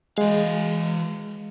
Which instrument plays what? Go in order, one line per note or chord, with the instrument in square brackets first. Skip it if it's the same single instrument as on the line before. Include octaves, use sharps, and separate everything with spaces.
[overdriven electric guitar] E3 F5 [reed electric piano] G#3